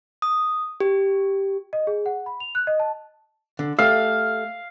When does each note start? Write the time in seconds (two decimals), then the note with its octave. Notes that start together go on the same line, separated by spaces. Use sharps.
0.22 D#6
0.80 G4
1.73 D#5
1.87 G#4
2.06 F#5
2.26 B5
2.40 F7
2.55 F#6
2.67 D#5
2.80 A5
3.59 D3
3.79 A3 G4 F5